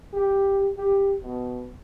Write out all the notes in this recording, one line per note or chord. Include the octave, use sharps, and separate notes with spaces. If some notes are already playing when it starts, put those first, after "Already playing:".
G4
G4
B2